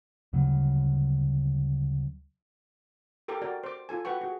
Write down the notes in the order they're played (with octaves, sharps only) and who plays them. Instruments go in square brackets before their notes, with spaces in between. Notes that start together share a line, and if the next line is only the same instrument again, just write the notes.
[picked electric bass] D2 C#3 F#3 G3
[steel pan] G4 A4 A#4 G5 A#5 D6
F#4 A#4 D5 G5
C5 D6
F4 A4 G#5
F#4 B4 F#5 G5 C#6
F#4 G#4